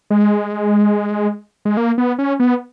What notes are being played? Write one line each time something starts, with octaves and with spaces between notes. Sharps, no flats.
G#3
G#3
A#3
B3
C#4
B3